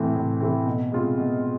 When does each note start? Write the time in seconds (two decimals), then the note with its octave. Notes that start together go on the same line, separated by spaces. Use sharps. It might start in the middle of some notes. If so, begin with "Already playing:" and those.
Already playing: A2 E3 A3 C4
0.15 A2
0.40 E3 A3 C4
0.66 B2
0.92 G#3 C4 F4
1.18 B2